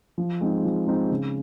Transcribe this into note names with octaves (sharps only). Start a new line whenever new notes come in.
F3
G#3 C4 D#4
F3
G#3 C4 D#4
C#3